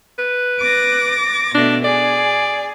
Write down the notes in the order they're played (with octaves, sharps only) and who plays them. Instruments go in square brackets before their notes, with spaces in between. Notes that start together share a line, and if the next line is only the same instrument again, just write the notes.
[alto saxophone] B4
[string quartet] D6 A6 A#6
[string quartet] B2 A3 [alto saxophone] D4
[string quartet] G#4 [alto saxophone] D5